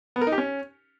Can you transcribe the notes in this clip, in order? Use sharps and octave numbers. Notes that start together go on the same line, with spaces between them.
B3
A#4
D#4
G4
C#4